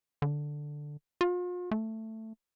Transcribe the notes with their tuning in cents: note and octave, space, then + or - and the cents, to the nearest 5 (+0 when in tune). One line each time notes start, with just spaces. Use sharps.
D3 +5
F4 +40
A3 +10